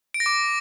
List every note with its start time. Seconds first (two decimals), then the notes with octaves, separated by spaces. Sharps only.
0.14 D7
0.20 A#6
0.26 D6